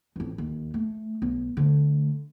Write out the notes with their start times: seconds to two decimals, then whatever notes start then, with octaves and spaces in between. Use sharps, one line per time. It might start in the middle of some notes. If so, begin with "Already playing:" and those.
0.16 A1 F2
0.38 D#2
0.74 A3
1.22 B1
1.57 D3 A3